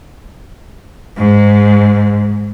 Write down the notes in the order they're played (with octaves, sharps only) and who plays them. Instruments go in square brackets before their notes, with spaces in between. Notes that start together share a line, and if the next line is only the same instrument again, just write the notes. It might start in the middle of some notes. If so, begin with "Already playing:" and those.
[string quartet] G#2